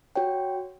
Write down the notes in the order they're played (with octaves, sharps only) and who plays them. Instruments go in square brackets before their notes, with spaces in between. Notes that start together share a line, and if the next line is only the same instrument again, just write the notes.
[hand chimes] F#4 C#5 G5